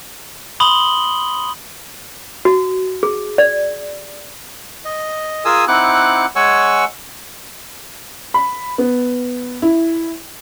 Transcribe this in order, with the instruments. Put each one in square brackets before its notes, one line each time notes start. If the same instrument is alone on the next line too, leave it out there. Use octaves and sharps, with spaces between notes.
[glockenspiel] B5 C6 D#6 F#7 G7
[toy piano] F#4
G#4
D5
[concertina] D#5
F4 G#4 A#4 G#5 D#6 E6
C4 D#4 E4 F#5 D6 F#6
G#3 C#5 F#5 G#5 C#6 E6
[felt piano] B5
B3
E4